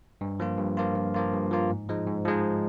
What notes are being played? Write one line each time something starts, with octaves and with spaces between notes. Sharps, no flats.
G2
F3 A#3 F4
G2
F3 A#3 F4
G2
F3 A#3 F4
G2
F3 A#3 F4
G#2
F3 G#3 D#4
G#2
F3 G#3 D#4